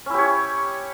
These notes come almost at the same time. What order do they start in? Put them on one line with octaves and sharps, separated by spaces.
C#4 E4 G4 C#5